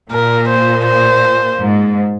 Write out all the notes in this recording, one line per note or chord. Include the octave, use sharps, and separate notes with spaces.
A#2 A#4
C5
C5
G#2